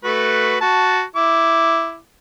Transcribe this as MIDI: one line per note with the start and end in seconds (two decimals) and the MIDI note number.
0.04 0.59 57
0.04 0.59 66
0.04 0.59 71
0.61 1.02 66
0.61 1.02 81
1.16 1.97 64
1.16 1.97 86